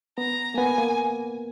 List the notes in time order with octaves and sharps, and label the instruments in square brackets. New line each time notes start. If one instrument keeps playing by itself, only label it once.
[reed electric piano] B3 [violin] A#5
[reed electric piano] A#3
[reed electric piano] B3 [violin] G#5
[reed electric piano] A#3